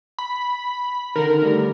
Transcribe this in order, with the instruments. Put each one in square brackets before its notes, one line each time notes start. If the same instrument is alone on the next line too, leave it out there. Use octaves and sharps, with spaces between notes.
[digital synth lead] B5
[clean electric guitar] D3 D#3 [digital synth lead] A#4
[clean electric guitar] D3 G3 A3